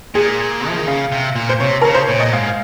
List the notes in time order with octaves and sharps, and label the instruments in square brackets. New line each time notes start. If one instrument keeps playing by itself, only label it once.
[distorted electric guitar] A#2 [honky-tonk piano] G#4
[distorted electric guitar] F3
D#3
[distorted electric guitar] C#3 [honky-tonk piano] F5
[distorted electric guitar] C3
A#2
[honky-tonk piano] C5
[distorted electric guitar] C3 [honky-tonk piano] C#5
[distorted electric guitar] C#3 [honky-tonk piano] A#4
[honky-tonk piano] C5
[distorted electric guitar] A#2 [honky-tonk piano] C#5
[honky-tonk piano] D#5
[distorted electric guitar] A#2
[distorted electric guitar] G#2 [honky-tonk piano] F5